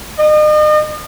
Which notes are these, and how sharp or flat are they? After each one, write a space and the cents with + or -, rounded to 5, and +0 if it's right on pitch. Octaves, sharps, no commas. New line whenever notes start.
D#5 -40